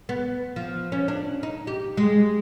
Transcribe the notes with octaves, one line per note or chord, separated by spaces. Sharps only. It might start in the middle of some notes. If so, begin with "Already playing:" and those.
B3
F3
C#4
D4
D#4
G4
G#3